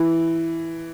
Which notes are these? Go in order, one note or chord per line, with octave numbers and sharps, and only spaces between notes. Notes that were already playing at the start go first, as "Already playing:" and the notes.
Already playing: E3